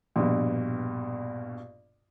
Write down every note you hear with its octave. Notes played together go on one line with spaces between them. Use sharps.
A#1 G2 B2